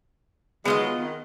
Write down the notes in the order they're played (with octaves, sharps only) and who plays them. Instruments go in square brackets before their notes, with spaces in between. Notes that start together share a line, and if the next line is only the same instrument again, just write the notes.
[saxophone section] D#3 F#3 G#3 [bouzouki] B3 F4 D#5
[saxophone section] D#3